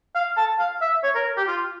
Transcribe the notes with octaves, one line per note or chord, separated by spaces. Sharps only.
F5
A5
F5
E5
C#5
A#4
G4
F4